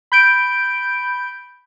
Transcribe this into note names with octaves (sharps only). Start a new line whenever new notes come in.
B5 G6 D7